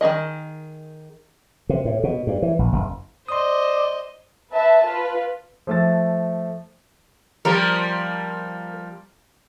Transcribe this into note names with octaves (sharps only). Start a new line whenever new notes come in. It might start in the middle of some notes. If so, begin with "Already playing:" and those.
D#3 A#3 G#4 D#5
C3
A2
B2
G2
E3
A#1
F#1
C5 D5 D#5 C6 D#6
B4 E5 A5
F4 B4
F3 A3 E5 A6
F3 G3 A#3 A#4